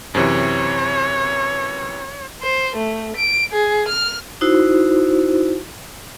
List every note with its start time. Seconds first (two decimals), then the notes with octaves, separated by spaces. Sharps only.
0.15 F#2 C3 E3 C#5
2.42 C5
2.76 A3
3.17 D7
3.52 G#4
3.88 F6
4.41 D#4 E4 F#4 C5